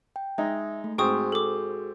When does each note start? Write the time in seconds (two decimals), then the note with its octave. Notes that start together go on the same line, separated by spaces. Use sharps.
0.16 G5
0.38 G#3 D#4 E5
0.84 A3
0.98 G#2 C4 F#4 G#4 G5 C#6 D#6
1.32 A4 D6